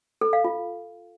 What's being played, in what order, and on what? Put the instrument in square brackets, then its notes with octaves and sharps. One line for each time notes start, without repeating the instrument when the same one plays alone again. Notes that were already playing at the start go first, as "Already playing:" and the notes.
[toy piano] A4
F5
F4